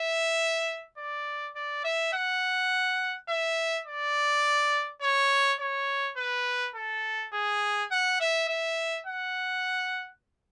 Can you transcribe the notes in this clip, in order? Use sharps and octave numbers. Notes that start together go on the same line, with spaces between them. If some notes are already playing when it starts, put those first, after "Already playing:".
Already playing: E5
D5
D5
E5
F#5
E5
D5
C#5
C#5
B4
A4
G#4
F#5
E5
E5
F#5